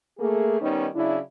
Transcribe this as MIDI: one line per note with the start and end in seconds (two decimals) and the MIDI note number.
0.19 0.60 57
0.19 0.60 58
0.19 0.60 68
0.61 0.87 51
0.61 0.87 55
0.61 0.87 59
0.61 0.87 61
0.61 0.87 63
0.95 1.19 49
0.95 1.19 54
0.95 1.19 62
0.95 1.19 64